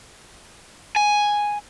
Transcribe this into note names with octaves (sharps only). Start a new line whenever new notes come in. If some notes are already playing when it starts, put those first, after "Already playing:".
G#5